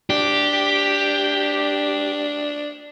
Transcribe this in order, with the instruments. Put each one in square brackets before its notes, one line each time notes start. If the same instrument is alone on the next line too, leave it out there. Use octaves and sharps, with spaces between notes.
[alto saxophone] D4 [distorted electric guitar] G4